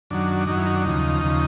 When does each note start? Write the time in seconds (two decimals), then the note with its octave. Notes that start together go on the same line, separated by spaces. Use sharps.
0.10 F#2 D#3 F#3 D4
0.47 F#2 D#3 F#3 D#4
0.57 E4
0.66 D#4
0.75 D4
0.85 D#2 C#3 F3 D#4
1.21 D#2 C#3 F3